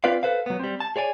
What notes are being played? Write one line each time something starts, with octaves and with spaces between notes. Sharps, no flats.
C4 F4 B4 D5 F5
A4 B4 C5 F5
F#3 B3
G3 C4
A5
G#4 C#5 D5 G#5